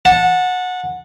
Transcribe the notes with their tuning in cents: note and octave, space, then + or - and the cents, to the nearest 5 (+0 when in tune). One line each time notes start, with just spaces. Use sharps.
F#5 -20 A5 +0